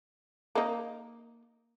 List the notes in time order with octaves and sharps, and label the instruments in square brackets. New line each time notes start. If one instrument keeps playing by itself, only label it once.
[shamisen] A#3 D#4